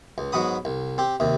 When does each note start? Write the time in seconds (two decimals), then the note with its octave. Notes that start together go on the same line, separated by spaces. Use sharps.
0.18 C#2
0.32 G#2 F#3 B3 F#4 B5 D#6
0.65 C2
0.98 C4 G4
1.20 D#2 C3